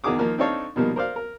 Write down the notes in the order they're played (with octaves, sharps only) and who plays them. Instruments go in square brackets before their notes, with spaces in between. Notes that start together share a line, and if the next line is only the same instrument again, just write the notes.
[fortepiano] E2 D#3 F#4 G#4 D6 D#6
D#3 F3 A#3 F6
C4 D4 D#4 A4 C#5 F5
B2 D#3 F3 G3 A#3
A#4 C5 D5 F5
A#4